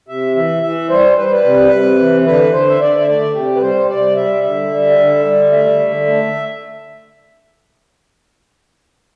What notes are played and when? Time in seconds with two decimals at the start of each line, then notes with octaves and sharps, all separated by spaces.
0.08 C3 E5
0.35 E3 E5
0.63 E3 E5
0.90 G3 C5
1.17 G3 B4
1.24 C5
1.32 B4
1.44 C3
1.71 C3
1.98 E3
2.26 D3 B4
2.53 D3 C5
2.69 E5
2.80 D3 D5
3.00 E5
3.07 A3 D5
3.34 C3 G4
3.56 B4
3.61 G3 C5
3.89 C3 D5
4.15 G3 E5
4.43 D3 E5
4.71 G3
4.98 D3
5.25 G3
5.52 A3 E5
5.79 D3
6.06 A3